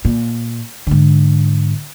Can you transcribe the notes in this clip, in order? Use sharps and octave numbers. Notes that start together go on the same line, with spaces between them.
A#2
G#2 D3